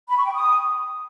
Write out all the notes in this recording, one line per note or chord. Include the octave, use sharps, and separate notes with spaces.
B5
C#6
G5
D#6